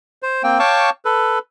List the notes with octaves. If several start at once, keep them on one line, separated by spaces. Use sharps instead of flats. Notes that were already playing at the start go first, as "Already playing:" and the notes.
C5
A#3 C4 G5
C#5 F5 G5 A5 C#6 D6
A4 B4